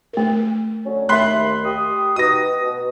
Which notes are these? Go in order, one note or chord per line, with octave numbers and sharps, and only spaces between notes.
A3 A#4
D3 F#3 C#4
D#2 A3 E5 B5 C6 F#6
G4 D#6
D#4 F#4 G4 B4 D#6 A#6
B2